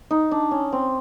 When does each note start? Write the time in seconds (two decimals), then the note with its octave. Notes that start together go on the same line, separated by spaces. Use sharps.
0.11 D#4
0.31 D4
0.51 C#4
0.72 C4